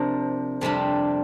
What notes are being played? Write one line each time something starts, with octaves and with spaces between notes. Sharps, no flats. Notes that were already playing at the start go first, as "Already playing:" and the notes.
Already playing: C3 F3 D4 A#4
F2 C3 G3 D4